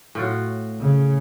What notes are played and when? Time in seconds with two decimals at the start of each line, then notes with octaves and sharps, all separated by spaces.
0.15 A2 F4 F#4
0.80 C#3